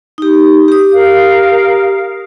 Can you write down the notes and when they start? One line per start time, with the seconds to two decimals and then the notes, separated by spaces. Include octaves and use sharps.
0.18 D#4 G4
0.68 G4 D#6
0.94 A#4 F5